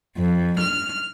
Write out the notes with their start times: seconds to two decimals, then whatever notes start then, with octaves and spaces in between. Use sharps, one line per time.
0.17 F2
0.60 F6